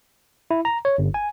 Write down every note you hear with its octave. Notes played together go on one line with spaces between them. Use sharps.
E4
A#5
C#5
G1
G#5